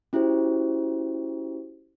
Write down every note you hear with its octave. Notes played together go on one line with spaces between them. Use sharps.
C#4 E4 F#4 G4 C5